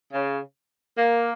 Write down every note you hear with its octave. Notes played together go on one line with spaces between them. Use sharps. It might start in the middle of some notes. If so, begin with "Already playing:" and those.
C#3
A#3